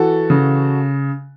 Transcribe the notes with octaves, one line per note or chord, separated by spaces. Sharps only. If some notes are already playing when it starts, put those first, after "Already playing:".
Already playing: E3 F#4 A4
C#3